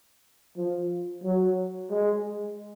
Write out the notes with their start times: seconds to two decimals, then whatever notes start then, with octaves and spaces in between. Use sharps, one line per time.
0.57 F3
1.24 F#3
1.90 G#3